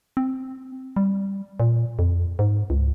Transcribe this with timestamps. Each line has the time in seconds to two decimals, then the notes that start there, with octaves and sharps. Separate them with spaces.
0.17 C4
0.96 G3
1.60 A#2
1.99 F2
2.39 G#2
2.70 C#2